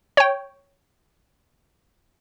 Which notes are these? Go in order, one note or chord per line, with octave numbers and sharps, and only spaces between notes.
C#5 G5